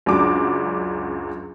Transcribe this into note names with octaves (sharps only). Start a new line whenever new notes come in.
C#2 F#2 F#3 D4 D6